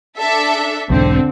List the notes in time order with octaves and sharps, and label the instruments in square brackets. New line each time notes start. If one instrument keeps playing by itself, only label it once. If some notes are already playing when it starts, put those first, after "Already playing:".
[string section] D4 A4 E5
[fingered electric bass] B1 E2 G#2 [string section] D3 C4